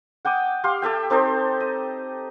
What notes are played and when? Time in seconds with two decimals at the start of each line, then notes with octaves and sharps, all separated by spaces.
0.25 F#5 G5 D6 D#6
0.64 G4 F5 C6
0.82 G4 A4 E5 G5
1.10 C4 D#4 A4 C5
1.60 D#5